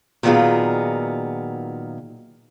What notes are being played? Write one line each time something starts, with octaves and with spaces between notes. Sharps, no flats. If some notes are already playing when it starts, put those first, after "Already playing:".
A#2 D#3 F#3 B3 F4 G#4